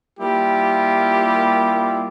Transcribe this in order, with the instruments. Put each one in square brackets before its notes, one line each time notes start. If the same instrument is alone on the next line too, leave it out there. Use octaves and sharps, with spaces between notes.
[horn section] G3 A#3 E4 F4 G4